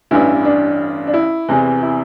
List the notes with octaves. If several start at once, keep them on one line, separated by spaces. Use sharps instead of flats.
A1 G2 E3 E4
D4
D4
E4
E2 C3 E3
E4